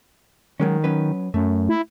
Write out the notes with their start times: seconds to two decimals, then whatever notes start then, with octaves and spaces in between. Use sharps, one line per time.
0.60 D#3 F#3 G#3 C#4
0.84 F#3 C#4 B4
1.34 F#2 A3
1.69 E4